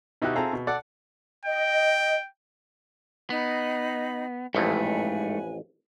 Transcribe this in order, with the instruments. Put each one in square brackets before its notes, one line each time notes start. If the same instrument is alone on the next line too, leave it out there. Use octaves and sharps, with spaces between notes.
[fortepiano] B2 D#4 E4 F#4 G4 F#6
C4 F4 G#4 A4 E5 A#5
B2
A4 D5 F#5
[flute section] D#5 [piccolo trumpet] G5
[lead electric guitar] B3 [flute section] D#4 D#5 B5
[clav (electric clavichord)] A1 F2 [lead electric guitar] G#2 A3 [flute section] B4 G#5